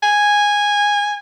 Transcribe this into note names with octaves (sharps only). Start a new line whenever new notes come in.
G#5